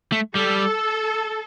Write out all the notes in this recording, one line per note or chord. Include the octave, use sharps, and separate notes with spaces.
A3
G3 A4